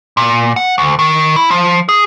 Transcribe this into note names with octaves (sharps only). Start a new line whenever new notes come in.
A#2
F#5
D2
D#3
E4
F3
G#4